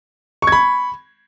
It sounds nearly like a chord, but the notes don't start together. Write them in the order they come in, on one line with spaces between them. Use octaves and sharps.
C#6 G#6 B5